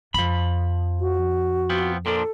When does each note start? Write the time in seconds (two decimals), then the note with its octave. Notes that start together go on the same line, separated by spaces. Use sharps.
0.14 F2 F3 B5
1.00 F#4
1.70 F3 B3 C4
2.06 A#2 F3 D4 A4